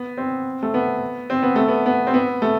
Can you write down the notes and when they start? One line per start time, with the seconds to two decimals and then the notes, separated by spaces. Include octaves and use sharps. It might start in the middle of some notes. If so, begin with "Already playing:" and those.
Already playing: B3
0.17 C4
0.63 A3
0.74 B3
1.30 C4
1.43 B3
1.56 A3
1.68 B3
1.86 B3
2.07 C4
2.14 B3
2.42 A3